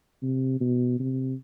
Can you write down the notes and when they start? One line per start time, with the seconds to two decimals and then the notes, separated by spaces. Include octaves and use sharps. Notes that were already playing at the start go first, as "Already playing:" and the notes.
0.23 C3
0.61 B2
1.00 C3